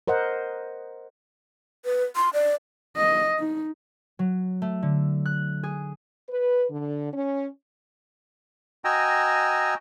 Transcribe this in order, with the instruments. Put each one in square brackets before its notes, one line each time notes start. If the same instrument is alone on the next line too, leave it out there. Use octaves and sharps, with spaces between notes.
[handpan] A#4 C5 D#5 F#5
[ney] B4
C6
D5
[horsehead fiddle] D#5
D#4
[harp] F#3
A3
D3
F#6
G#4
[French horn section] B4
D3
C#4
[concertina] F#4 D#5 G5 G#5 A#5 E6